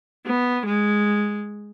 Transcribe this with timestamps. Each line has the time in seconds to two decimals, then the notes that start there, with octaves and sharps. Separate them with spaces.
0.26 B3
0.66 G#3